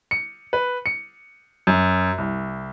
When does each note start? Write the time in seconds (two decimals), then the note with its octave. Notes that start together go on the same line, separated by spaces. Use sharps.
0.11 C#7
0.53 B4
0.86 C#7
1.67 F#2
2.18 C2